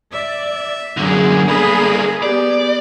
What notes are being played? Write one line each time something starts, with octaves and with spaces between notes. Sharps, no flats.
D5 E5
F#2 D3 A#3 G#4
G3 A4 B5 D#6
B3 G4 D5